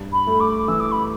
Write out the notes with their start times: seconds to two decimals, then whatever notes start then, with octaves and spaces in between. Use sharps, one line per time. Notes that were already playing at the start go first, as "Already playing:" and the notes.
Already playing: G2
0.13 B5
0.27 A3
0.40 D6
0.68 E3 E6
0.80 D6
0.92 B5